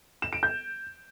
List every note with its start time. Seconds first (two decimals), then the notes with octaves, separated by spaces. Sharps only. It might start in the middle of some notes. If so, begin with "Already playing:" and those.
0.22 E7
0.33 D7
0.43 G6